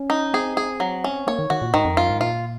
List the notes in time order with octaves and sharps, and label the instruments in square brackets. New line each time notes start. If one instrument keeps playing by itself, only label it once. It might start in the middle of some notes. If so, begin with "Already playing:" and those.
Already playing: [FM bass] C#4
[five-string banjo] D#4
[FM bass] C4 [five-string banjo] G#4
[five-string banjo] G#4
F#3
C#4
[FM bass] A#3 [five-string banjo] C#5
[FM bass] D#3
[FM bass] D#3 [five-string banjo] F#4
[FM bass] A#2
[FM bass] G#2 [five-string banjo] D#3
[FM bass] F2
[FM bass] F#2 [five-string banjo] F4
[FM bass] G#2
[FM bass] A#2 [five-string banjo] F4